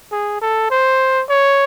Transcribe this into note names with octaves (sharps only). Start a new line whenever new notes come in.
G#4
A4
C5
C#5